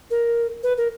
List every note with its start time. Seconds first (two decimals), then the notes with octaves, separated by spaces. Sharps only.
0.11 A#4
0.63 B4
0.78 A#4